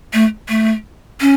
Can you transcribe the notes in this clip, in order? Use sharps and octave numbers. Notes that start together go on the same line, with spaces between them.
A3
A3
C#4